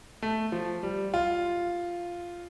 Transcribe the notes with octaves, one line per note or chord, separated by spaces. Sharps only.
A3
F3
G3
F4